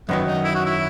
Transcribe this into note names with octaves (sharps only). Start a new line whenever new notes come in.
F#2 D#3 F#3 B3
D#4
E4
F#4
E4